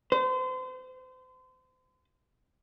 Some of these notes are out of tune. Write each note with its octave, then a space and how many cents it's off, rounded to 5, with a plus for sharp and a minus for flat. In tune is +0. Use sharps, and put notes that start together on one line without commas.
C5 -35